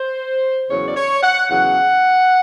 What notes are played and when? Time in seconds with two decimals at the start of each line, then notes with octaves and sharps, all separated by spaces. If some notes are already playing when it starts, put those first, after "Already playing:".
Already playing: C5
0.69 E2 C#3 F#3 C#5
0.88 D5
0.95 C#5
1.22 F#5
1.49 E2 C#3 F#3 F#5